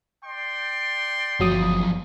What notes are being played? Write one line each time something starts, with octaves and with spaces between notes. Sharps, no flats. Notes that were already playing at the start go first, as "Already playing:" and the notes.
D5 G5 C6
G1 E2 F3 F#3 D#6